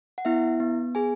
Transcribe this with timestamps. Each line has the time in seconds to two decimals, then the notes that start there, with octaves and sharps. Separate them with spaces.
0.18 F#5
0.25 B3 E4 E5
0.60 B3
0.95 G#4 G#5